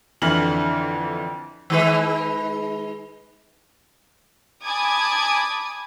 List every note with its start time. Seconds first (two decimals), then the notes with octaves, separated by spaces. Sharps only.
0.22 F2 D3 E3 F6 F#7
1.70 D#3 G#3 B4
4.64 G#5 A5 B5 D6 D#6 G#6